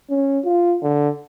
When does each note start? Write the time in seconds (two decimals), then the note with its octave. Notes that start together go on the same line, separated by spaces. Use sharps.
0.10 C#4
0.45 F4
0.82 D3